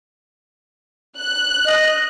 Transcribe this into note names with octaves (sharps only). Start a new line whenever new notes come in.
F#6
D#5